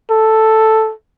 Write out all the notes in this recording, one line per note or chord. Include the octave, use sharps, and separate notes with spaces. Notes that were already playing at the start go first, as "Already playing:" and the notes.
A4